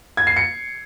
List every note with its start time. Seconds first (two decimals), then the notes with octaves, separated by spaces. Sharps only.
0.17 G#6
0.27 C7
0.36 C#7